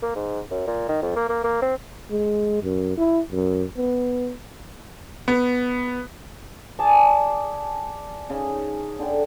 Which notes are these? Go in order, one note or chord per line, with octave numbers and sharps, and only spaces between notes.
A#3
G#2
F#2
A#2
D#3
F2
A#3
A#3
A#3
C4
G#3
F#2
E4
F#2
B3
B3
G#4 D5 G#5 A5
C#3 D#4
D3 G5